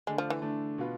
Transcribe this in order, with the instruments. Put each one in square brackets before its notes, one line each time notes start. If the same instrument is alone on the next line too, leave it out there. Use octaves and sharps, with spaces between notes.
[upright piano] D3 A3 D4 [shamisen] G#3
[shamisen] F3
E3
[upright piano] D3 A3 D4
B2 B3 F4 B4